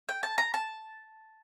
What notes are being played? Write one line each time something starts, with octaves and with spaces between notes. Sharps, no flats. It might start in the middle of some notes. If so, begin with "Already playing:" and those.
G5
A5
A#5
A5